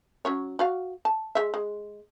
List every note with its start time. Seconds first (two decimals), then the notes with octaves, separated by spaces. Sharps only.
0.25 F#3 C#4 C#5
0.59 F#4 D5 F5
1.05 A5
1.35 G#3 E5
1.54 G#3